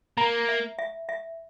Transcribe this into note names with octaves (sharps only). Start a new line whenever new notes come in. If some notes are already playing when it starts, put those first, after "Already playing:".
A#3 A#5
E5
E5
E5